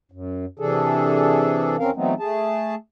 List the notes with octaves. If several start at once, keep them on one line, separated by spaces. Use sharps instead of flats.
F#2
C3 E3 D4 G#4 A4
E2 C4 C#4 A#4 F5
E3 F#3 A3 B3 C4 D#4
A3 G#4 A5